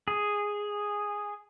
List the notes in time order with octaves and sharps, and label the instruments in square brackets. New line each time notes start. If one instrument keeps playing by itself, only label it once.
[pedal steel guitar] G#4